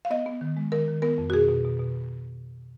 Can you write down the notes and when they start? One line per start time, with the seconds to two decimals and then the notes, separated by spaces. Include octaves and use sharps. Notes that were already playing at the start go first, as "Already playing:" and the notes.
0.05 F5
0.10 B3 D#5
0.26 B3
0.41 D#3
0.57 G#3
0.72 D#3 A#4
0.88 D#3
1.02 B3 A#4
1.18 F2
1.30 F#4
1.33 B2 G#4
1.48 B2
1.65 B2
1.79 B2